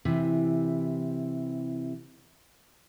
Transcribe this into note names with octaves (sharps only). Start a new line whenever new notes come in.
C3 E3